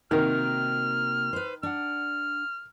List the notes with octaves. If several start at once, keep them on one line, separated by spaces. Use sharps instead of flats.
C3 D#3 A#3 F#4 A#4 F6
B4 C5
D4 F#5 F6